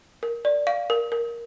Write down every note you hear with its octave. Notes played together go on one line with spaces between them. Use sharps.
A#4
D5
F5
A#4
A#4